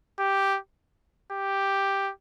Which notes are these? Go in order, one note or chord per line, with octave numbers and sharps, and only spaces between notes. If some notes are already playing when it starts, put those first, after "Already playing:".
G4
G4